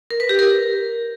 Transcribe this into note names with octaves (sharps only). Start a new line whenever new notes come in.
A#4
B4
G4
A#4